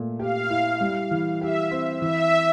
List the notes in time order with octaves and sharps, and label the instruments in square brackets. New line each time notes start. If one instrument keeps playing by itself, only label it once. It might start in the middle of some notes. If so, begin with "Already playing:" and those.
Already playing: [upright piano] A#2 A3
[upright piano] G4 [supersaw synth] F5
[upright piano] E4
G3
E3
[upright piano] G4 [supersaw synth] E5
[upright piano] C4
[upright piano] E3 [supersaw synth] E5